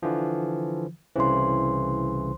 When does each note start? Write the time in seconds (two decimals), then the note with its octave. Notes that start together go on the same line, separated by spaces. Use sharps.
0.03 D3 E3 F3
1.16 C2 C#3 E3 C5 C6